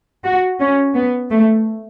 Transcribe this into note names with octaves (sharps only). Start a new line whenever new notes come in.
F#4
C#4
B3
A3